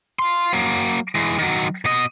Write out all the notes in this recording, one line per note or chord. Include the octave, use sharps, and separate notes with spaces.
F5 C6
F#3 A#3
E3 G#3
D#3 F#3
B2 D#5